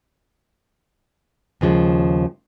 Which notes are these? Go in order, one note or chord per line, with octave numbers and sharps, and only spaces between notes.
D#2 C#3 F3 G#3